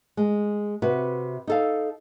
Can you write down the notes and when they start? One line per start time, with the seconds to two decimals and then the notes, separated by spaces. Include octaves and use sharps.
0.17 G#3
0.82 C3 F#4 B4
1.47 D#4 A4 F5